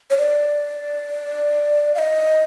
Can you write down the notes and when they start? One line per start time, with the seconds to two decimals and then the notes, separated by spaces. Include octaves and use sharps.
0.10 C#5
0.18 D5
1.95 F5
1.99 D#5